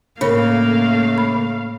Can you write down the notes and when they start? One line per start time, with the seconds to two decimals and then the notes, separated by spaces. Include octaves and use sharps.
0.21 A2 C#3 A3 A#3 A#4 F5 B5
1.18 B5